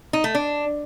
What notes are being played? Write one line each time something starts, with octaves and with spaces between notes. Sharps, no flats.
D#4
A3
D4